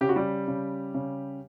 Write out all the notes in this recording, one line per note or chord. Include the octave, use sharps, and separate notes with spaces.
C#3 G4
F#4
G3 G4
C#3
C#3